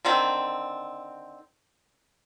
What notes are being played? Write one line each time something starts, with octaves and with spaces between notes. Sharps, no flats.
D3 D#3 C4 A4